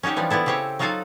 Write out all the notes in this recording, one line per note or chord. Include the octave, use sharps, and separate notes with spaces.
C#4 D#4 F#4 G4 C#5
E3 F3 G3 D4
B3 D4 E4 A4
C#3 C4 G4 C5 C#5
F#3 D#4 F4 F#4 A4 F5